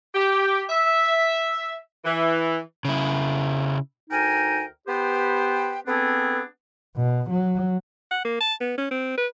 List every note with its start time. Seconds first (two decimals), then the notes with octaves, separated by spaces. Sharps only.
0.14 G4
0.70 E5
2.05 E3
2.85 C#3 E4
4.10 D2 D#4 A#4 G5 G#5
4.87 B3 G4 B4 C5 G5
5.87 B3 C4 D4 G#4 A4
6.97 B2
7.30 F#3
8.11 F#5
8.25 A#3
8.40 A5
8.61 B3
8.78 C#4
8.91 C4
9.17 B4